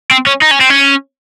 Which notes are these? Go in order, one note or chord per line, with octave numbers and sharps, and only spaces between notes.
C4
C#4
D#4
C#4
C4
C#4